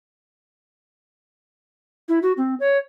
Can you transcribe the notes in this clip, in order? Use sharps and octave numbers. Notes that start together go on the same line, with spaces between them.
E4
F#4
C4
C#5